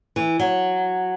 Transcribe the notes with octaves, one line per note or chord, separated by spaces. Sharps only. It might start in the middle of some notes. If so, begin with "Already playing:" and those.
E3
F#3